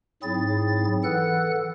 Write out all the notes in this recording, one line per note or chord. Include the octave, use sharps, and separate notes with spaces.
G#2 F#3 C4 E4 G#4 A6
E3 A4 F#5 F#6